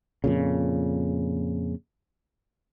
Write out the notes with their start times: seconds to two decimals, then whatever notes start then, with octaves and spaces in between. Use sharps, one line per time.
0.24 F2 A#2 C#3